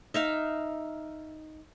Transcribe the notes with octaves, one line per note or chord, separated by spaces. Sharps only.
D#4 E5 F5